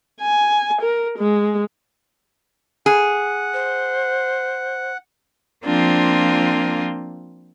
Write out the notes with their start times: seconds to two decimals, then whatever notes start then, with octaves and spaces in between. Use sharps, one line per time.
0.21 G#5
0.81 A#4
1.19 G#3
2.86 G#4 F#5
3.54 C5
5.65 F3 A#3 C4 D4 F4